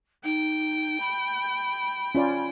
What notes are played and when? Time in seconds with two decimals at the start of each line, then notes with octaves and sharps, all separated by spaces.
0.24 D#4 G5
1.00 B5
2.15 C#4 F4 D5